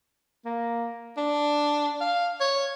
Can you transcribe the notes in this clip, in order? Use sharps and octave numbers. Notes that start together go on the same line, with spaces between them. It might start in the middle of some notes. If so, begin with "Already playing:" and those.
A#3
D4
F5
C#5